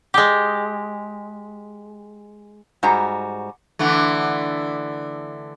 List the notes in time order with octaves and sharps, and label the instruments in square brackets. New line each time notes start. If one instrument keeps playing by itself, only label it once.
[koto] G#3 G4
[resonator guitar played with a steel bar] G#2 G3 F#4 A#5
[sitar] D3 E3 A3